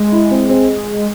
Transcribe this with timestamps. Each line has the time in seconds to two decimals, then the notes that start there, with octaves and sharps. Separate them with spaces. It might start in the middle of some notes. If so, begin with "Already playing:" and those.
Already playing: G#3
0.12 E4
0.31 C4
0.49 C4